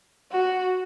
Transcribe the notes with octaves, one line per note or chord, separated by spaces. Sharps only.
F#4